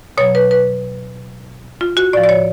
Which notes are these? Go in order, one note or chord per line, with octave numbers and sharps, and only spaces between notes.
B2 F#3 C#5
B4
B4
F4
F#4
A2 F3 D5
D5
C#5